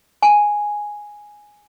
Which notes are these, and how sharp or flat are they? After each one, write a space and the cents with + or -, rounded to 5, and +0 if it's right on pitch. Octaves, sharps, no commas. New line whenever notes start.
G#5 +0